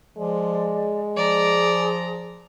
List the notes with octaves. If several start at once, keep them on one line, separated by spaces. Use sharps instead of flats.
F3 G#3 D5
F3 G#4 D5 A#5